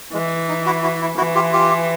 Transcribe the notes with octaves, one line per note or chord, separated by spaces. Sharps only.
E3 G#3
D#4
E4 F#4
E4 F#4
E4
E3 E4 F#4
F4 G4
F4 G4